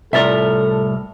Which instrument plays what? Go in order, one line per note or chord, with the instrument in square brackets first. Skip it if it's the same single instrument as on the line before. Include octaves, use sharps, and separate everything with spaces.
[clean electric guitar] C2 A2 A#4 [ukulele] F4 D5 E5 [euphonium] A4